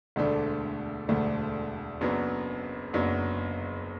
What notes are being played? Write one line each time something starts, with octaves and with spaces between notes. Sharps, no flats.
E1 D2 D3 A3 D4
E1 D2 D3 A3 D4
F#1 F#2 F#3 B3 D4
F#1 F#2 F#3 B3 D4